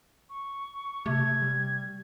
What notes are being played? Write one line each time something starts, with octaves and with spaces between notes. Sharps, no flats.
C#6
C3 A3 G#6
G3